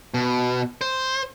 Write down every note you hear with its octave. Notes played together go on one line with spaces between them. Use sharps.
B2
C5